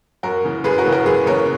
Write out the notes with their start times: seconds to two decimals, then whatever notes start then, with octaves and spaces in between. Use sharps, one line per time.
0.23 F#2 F#4 A#4
0.44 C#3 E3
0.64 F#2 G#4 B4
0.78 F#4 A#4
0.86 C#3 E3
0.92 F#4 A#4
1.06 F#2 G#4 B4
1.26 C#3 E3 A#4 C#5